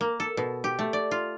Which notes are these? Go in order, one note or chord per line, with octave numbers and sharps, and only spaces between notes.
A#3
A4
B2
G4
A3
D5
F4